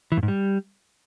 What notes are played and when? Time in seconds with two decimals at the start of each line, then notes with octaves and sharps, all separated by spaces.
0.12 E3
0.17 G2
0.23 G#2
0.28 G3